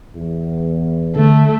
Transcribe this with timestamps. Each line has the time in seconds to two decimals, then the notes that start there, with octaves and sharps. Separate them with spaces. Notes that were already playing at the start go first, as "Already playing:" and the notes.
0.15 E2
1.16 D3 A3